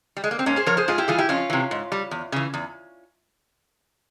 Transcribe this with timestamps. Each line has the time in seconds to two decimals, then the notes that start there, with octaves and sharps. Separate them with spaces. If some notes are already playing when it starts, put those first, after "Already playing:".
0.17 G3
0.24 G#3
0.31 A#3
0.39 C4
0.46 G#2 A#3 C#4
0.56 G#4 C5
0.66 F3 A#4 C#5
0.77 G#4 C5
0.88 G#2 F4 G#4
0.98 E4 G4
1.08 E3 G3 F4 G#4
1.18 E4 G4
1.29 F2 C#4 F4
1.50 C3 E3
1.71 G#2
1.92 G3
2.11 E2
2.32 C#3 E3
2.54 E2